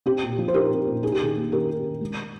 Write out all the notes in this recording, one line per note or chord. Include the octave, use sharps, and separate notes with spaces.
C4 G4
A#2
F3
C5
D#4 G4 A#4
C4
A#2
D#4 G#4
G4
D#3 G#4
A#3
D#3 G4 A#4
D#4
D#3
G#3